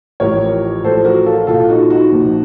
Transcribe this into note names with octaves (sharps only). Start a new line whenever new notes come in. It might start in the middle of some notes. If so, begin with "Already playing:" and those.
A1 A2 F3 A#4 C#5
A1 A2 F3 A4 C5
F#4 A#4
F4 A4
A#1 A#2 F3 F4 A4
D#4 F#4
D#4 F#4
A#1 A#2 F3